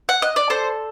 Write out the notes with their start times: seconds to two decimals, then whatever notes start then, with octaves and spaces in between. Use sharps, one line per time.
0.09 F#5
0.22 D#5
0.36 D5
0.50 A4 C5